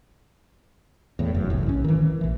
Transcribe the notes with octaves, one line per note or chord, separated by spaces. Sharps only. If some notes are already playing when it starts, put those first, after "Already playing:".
E2 A2
F1 F#2
C2 A2
A1 C#4
D#3 E3
A#1 E3